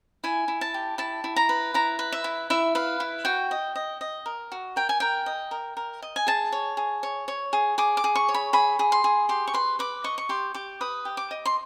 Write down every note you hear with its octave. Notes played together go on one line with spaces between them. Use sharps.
E4 G#5
E4
A5
G4
E4 A5
E4
A#5
B4
E4 A#5
B4
E5
E4
E4 E5
B4 F5
E4
F#4 G5
D#5
D#5
D#5
A#4
F#4
A#4 G5
G#5
A#4 G5
D#5
A#4
A#4
D#5
G#5
G#4 A5
C#5
G#4
C#5
C#5
G#4
G#4 D6
D6
G#4
C#6
C#5
B5
G#4 B5
G#4
C6
G#4
G4 C6
C#6
B4 C6
B4 D6
D#5 C#6
C#6
G4 C6
G4 D6
B4 D#6
G4
D6
D#5
C6